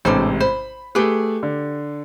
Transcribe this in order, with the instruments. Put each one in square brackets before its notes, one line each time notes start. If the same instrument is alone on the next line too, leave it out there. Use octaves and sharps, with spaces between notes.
[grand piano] A1 G#2 C3 [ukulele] D4 A4 C5
[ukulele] C5 [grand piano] B5
[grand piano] A3 G#4 [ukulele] G4 B4
[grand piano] D3